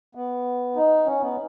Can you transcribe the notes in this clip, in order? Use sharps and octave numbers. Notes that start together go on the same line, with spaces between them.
B3
D#4
C#4
B3